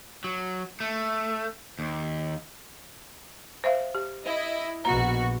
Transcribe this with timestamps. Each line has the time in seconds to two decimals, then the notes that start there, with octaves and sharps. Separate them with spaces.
0.24 F#3
0.80 A3
1.79 D#2
3.64 C5 E5 F5
3.95 G4
4.25 E4 D#5
4.85 A#1 B2 F#4 A#5